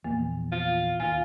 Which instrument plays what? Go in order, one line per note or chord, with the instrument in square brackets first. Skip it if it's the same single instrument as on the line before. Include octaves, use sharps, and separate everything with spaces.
[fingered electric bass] A#1 E2 [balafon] A#3
[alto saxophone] F4
[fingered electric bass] D1 D#2 D#3 [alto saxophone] F4 [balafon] G#5